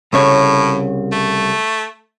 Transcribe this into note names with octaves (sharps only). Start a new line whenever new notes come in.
C2 A2 C#3 C#5
A3